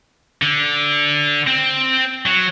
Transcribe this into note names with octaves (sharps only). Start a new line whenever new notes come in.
D3
C4
F#3